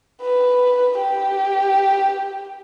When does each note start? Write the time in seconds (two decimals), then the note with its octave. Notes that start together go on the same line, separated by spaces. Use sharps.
0.22 B4
0.98 G4